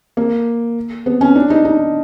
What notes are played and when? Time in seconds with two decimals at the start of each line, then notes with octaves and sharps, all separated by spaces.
0.17 A#3
1.06 B3
1.21 C#4
1.35 D4
1.50 D#4
1.65 D#4